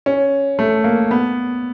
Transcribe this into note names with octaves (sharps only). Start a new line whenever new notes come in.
C#4
A3
A#3
B3